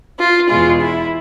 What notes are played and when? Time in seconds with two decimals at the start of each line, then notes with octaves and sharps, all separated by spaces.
0.18 F4
0.49 E2 B2 G#3 F4
0.81 E4